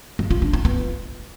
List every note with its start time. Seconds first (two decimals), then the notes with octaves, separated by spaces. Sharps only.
0.19 G#3
0.31 F4
0.42 D4
0.53 F4
0.65 B3